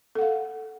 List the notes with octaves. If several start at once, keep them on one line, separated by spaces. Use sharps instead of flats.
A4 F5 F#5